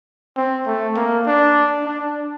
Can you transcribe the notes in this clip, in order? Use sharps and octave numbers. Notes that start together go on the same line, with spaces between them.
C4
A3
A#3
D4
D4